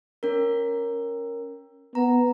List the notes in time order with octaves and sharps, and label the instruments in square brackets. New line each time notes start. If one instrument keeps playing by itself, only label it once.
[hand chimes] C#4 A#4
[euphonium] B3 [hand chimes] A#5